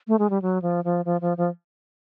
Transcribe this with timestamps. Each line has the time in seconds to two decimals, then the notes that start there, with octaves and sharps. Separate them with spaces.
0.08 A3
0.19 G#3
0.30 G3
0.42 F#3
0.62 F3
0.85 F3
1.05 F3
1.21 F3
1.37 F3